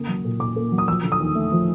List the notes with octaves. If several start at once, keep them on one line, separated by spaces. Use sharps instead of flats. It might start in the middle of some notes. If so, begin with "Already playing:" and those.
Already playing: C#3 A#3 D#6
F#3
A#2
A#2 D6
A#3
F#3
D#6
F3 E6
D3
D#6
D#2
A3
F3